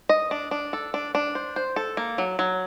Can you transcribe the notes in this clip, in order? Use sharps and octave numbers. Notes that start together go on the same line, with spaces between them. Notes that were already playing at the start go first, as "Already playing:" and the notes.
D#5
D4
D4
A4
D4
D4
C5
C5
A4
A#3
F#3
F#3